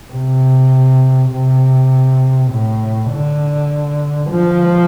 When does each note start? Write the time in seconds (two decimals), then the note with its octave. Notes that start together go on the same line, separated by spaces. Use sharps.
0.12 C3
1.32 C3
2.51 A2
3.11 D3
4.30 F3